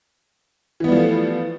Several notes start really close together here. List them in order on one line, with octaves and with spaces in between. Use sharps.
E3 B3 G3 F3 A3